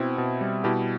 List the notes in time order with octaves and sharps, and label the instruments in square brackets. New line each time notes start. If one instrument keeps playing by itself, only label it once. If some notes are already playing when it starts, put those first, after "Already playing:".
Already playing: [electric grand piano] B2 C4 E4
B2
G3
B2 E4 G4